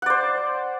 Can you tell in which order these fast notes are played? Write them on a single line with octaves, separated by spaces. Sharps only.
F#5 D5 C5